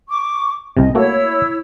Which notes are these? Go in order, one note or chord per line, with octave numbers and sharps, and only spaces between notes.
C#6 D6
C2 C3 D#5
A3 A#3 E4 F#4 C#5 E6